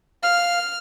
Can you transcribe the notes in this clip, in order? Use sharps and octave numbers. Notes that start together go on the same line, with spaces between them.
F5 F6